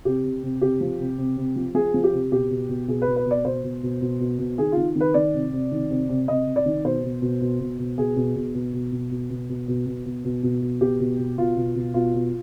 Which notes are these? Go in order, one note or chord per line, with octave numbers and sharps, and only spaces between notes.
C3 G4
C3
C3
C3 G4
F3
C3
C3
C3
F3
F3 G#4
F3
G4
C3
B2 G4
B2
B2
B2 G#4
B4
B2
B4
B2
D5
B2 C5
B2
B2
B2
B2
B2
D#3 G#4
D#3 F4
D#3
B4
D#3 D5
C3
C3
D#3
C3
C3
C3 D#5
C3
D5
D#3
B2 C5
B2
B2
B2
B2
B2
B2 G#4
B2
B2
B2
B2
B2
B2
B2
B2
B2
B2
B2
B2
B2
B2
B2 G4
B2
B2
B2 F4
B2
B2
B2 F4
B2